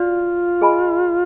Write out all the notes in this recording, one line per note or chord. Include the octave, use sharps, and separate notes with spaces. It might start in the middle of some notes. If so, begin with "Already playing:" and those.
Already playing: F4 F#4 D5 F5
G#4 D#5 G#5 B5